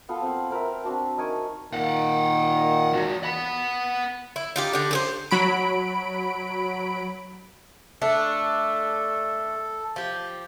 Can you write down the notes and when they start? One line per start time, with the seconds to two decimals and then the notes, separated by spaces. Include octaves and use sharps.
0.09 B3 F4 A4
0.22 C4 F4 F#5
0.51 C4 A#4 B4 E5
0.84 C4 D4 F#4 A5
1.18 D#4 A#4 G#5 C#6
1.73 A#2 D#3 F5 F#5
2.93 E3 F#4
3.23 F#5 B5
4.36 E4
4.56 D#4 F4 G4
4.73 D3 G4
4.91 G4 G#4 C5
5.31 F#3 B5 D7
8.02 A3 D4 A4
9.96 F3 G4